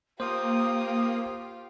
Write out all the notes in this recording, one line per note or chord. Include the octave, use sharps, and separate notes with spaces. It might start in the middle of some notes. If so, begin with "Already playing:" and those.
A#3 F4 G4 C5 D#6